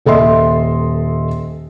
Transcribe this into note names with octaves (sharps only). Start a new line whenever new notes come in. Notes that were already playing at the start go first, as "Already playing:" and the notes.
D#1 A4 D#5 E5 C6